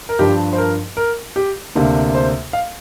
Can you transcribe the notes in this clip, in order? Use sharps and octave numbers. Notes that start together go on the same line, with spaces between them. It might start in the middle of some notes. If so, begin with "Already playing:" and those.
A#4
G2 F3 D4 G4
C5
A#4
A#4
G4
D2 C3 A#3 D4
C5
F5